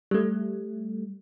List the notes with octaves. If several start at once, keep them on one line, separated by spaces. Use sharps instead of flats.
G3 A3